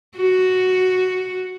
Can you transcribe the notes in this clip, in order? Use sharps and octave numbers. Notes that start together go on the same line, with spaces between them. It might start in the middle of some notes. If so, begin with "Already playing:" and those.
F#4